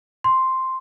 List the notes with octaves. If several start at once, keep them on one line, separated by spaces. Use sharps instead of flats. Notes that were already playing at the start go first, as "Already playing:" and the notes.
C6